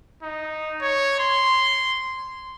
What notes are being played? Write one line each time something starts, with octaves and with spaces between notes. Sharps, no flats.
D#4
C#5
C6